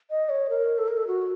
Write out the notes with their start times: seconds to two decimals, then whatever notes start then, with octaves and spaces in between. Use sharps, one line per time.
0.10 D#5
0.29 C#5
0.50 A#4
0.78 A4
0.88 A#4
0.97 A4
1.07 F#4